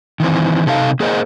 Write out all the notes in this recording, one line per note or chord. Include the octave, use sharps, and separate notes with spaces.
D#3 E3 C4
C3 D#4 A4 B4 F5
A#3 G#4 A#4 C5 D#5